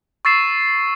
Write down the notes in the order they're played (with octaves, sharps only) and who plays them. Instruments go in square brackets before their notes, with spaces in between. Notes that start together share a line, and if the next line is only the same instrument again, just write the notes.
[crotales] C#6 E6 A6 C7 E7